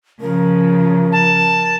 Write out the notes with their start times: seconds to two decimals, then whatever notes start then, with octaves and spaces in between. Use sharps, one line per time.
0.21 C#3 F3 A#4
1.12 A5